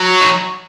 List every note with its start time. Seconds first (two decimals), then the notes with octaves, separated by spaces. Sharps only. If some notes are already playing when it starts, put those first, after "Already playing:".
Already playing: F#3
0.21 D#4